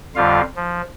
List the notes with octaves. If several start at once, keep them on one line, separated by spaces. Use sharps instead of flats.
F2 D3 G3 F4 F5
F3